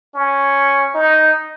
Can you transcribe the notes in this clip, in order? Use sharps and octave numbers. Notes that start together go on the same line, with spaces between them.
C#4
D#4